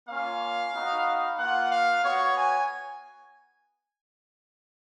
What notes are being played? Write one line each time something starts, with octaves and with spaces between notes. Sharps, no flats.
A#3 C#4 F4 F5
B3 D#4 F#4
A#3 F4 F#5
F5
B3 F#4 C#5
G#5